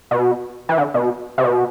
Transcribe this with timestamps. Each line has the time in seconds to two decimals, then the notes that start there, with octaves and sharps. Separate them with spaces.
0.11 B2
0.69 E3
0.78 D3
0.94 B2
1.38 C3
1.44 B2